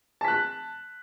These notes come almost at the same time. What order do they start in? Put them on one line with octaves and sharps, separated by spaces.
A5 B6 F#6